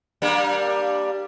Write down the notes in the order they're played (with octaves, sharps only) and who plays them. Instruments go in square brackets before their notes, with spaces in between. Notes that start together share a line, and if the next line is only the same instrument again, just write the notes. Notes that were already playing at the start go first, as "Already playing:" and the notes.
[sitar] G3 A#3 D4